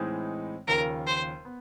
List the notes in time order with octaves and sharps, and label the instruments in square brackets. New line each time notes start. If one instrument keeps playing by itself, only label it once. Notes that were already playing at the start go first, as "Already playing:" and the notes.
Already playing: [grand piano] A2 E3 G#3 C4 D#4
[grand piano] D#2 C#3 F3 [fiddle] A#4
[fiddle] C5
[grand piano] B3